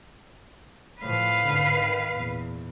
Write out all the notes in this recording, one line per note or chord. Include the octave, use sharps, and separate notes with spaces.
A2 F3 B4 F5
G#1 D3
D#3
E2 A#2